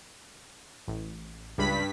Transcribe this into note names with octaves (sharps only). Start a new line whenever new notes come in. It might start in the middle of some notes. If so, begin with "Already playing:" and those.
A1
C#2 G2 B5 B6